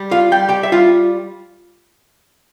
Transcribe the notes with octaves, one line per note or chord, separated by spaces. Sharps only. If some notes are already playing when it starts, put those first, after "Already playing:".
Already playing: G3
F4 F5
G3 G5
G4 G5
E5
G3 F4 F5